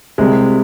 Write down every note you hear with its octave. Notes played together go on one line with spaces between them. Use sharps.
C2 C3 G3 G#3